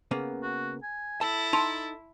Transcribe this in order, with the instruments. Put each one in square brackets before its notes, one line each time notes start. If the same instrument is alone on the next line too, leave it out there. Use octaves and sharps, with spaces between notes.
[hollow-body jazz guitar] C#3 A#3 B3
[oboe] F#4
G#5
[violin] E4 [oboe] A4 [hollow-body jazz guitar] A5
[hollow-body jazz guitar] D#4 [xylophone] A5 C6